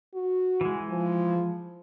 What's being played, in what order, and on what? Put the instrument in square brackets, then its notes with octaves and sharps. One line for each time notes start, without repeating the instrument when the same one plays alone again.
[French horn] F#4
[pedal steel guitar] E3 G#3
[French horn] F3